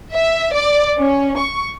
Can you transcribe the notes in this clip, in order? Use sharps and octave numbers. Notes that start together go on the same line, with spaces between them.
E5
D5
C#4
C#6